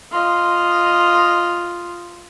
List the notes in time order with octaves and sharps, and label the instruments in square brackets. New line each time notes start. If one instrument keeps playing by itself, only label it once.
[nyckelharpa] F4 D#5